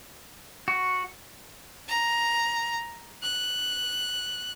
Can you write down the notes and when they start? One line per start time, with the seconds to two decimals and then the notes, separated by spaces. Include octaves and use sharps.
0.68 F#4
1.88 A#5
3.23 F#6